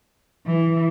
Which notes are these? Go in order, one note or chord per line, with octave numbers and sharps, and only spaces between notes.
E3